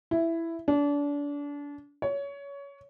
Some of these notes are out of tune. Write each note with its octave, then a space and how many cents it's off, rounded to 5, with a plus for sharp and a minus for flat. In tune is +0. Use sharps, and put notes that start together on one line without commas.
E4 +5
D4 -30
C#5 +20